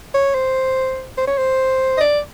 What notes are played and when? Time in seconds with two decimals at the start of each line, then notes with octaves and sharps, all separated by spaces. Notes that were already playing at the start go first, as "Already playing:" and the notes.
0.14 C#5
0.34 C5
1.18 C5
1.27 C#5
1.38 C5
1.98 D#5
2.01 D5